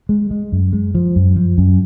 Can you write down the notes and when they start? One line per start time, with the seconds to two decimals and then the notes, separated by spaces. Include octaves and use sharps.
0.09 G#3
0.31 G#3
0.52 F#2
0.73 G#3
0.95 F3
1.16 F#2
1.36 F3
1.58 F#2